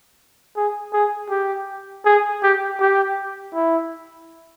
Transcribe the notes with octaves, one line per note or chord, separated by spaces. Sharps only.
G#4
G#4
G4
G#4
G4
G4
E4